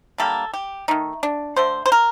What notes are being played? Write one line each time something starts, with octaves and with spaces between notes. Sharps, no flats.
D3 G3 A#3 A4
G4
D#3 A3 D#4
D4
D3 A3 C5
C5
A#4